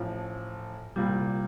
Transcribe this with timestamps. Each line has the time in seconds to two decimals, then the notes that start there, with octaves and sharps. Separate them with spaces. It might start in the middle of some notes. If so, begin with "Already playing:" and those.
Already playing: A1 A2 F3
0.96 C2 A#2 G3